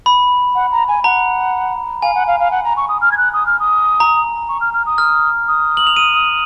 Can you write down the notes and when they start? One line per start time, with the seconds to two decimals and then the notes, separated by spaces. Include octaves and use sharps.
0.06 B5
0.55 F#5
0.72 A#5
0.88 G#5
1.04 F#5 A#5
2.02 F5 G#5
2.15 F#5
2.27 F5
2.40 F5
2.52 F#5
2.65 A#5
2.77 C#6
2.89 D#6
3.01 F6
3.12 G#6
3.17 F#6
3.34 D#6
3.46 F6
3.59 D#6
4.00 A#5
4.49 C#6
4.61 F6
4.74 F6
4.86 D#6
4.98 F6
5.48 D#6
5.77 F#7
5.87 F7
5.96 D#7